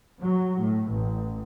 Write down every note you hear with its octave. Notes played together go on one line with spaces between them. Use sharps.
F#3
A2
A1